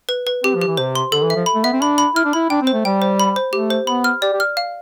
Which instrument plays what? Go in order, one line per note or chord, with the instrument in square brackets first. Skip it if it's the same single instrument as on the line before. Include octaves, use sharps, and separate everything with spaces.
[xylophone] B4
B4
[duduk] C4 [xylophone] G4
[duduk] F3
[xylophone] G4
[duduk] E3
[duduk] C3 [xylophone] C5
[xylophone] C6
[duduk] D3 [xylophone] A4
[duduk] E3
[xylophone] E5
[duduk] F3
[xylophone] B5
[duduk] A3
[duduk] B3 [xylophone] E5
[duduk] C4
[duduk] D4 [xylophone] B5
[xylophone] B5
[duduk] E4 [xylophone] F6
[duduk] D4
[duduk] E4 [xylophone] B5
[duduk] D4 [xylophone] G5
[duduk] C4
[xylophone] C5
[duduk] A3
[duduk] G3 [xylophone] G5
[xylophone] C5
B5
C5
[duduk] A3 [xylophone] G4
[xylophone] C5
[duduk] B3 [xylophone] B5
[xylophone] F6
[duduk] G4 [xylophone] D5
[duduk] G4
[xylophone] F6
F5